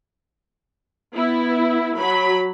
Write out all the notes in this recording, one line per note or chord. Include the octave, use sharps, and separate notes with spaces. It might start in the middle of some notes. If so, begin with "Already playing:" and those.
B3 E4
F#3 B5